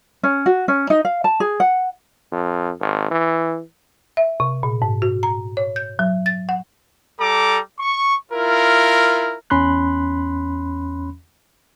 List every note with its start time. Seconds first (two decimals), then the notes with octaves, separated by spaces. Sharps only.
0.23 C#4
0.46 F#4
0.68 C#4
0.90 D#4
1.05 F5
1.24 A5
1.40 G#4
1.60 F#5
2.32 F2
2.80 G#1
3.11 E3
4.17 E5
4.40 C3
4.63 A#2
4.82 G#2
5.02 F#4
5.23 A#5
5.57 C#5
5.76 G6
5.99 F#3
6.26 A6
6.49 F#5
7.19 G3 A4 A#5 D6
7.79 C#6
8.31 E4 F4 A#4
9.50 E2 C#4 B5 C6 F#6